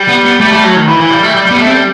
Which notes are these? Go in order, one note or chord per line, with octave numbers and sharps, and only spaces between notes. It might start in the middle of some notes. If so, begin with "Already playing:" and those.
Already playing: G3
B3
B3
G3 A3
G3
F#3
D#3
E3
E3
G3
A3
G3
G3 B3
A3
C4
G3